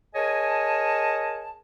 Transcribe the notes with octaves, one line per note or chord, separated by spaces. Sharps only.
G#4 A#4 C#5 D#5 G#5 A5